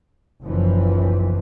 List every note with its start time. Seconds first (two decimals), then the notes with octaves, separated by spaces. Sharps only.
0.43 F#1 B1 F#2 E3 F3